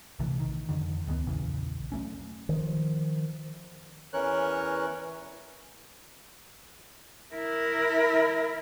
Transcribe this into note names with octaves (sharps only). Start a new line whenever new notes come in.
A#1 C3 E3 A3
D#3
F2 D3 D#3
D2 D#3 F3 B3
A#1 E2 C#3 E3
F#3 A3 C#4
D#3 F3
E2 E3 C#4 A#4 C#5 F#6
E4 A#4